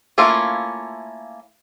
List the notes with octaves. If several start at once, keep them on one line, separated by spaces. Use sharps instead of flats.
A3 A#3 C#4 E4 F4